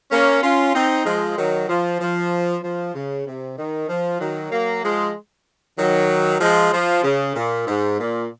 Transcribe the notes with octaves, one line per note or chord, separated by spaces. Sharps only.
A#3 C#4
C#4 F4
C4 D#4
F3 G#3
D#3 F#3
F3
F3
F3
C#3
C3
D#3
F3
D#3 F#3
F#3 A#3
F3 G#3
D#3 F#3
F3 G#3
F3
C#3
A#2
G#2
A#2